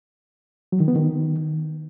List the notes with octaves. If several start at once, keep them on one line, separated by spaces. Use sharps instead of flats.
F#3
D#3
B3
D#3